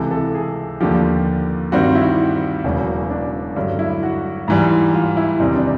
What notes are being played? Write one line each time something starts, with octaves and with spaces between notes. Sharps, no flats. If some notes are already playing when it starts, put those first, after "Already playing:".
Already playing: C#2 C3 E3 A4
A4
G#4
D#2 D3 F3 G4
G2 D#3 G3 C4 F#4
E4
E1 E2 C#3 F#3
D4
G2 D3 F#3
E4
F#4
G#2 E3 G3
F4
E4
E2 C3 D#3 G3 C4 D#4
D4